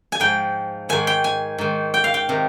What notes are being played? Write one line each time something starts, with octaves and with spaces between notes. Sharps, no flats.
G#5
G#2 F3 G5
G#2 D#3 G#5
G5
G#5
G#2 D#3
G5
F5
G5
C3 D#3